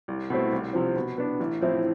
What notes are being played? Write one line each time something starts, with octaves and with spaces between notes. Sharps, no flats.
C2
B2 A3 C4
C2
C3 F3 C4
B2
B3 D4
A1
A2 F3 C4 E4